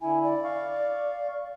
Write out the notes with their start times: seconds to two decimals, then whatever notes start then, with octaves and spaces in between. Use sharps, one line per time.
0.01 D3 E4 G#5
0.24 D5
0.44 F5 C#6